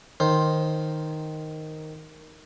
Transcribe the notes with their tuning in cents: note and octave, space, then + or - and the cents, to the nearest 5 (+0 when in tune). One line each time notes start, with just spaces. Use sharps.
D#3 +0 C5 +5